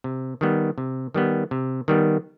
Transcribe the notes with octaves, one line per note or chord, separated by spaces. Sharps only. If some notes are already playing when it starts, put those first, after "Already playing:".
C3
D#3 G3 B3
C3
D#3 G3 B3
C3
D#3 G3 B3